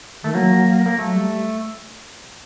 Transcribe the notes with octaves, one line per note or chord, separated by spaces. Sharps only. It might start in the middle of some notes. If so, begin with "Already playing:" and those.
D#3 A3
F#3 A#3
F#3
A#3
F#3 A3
G3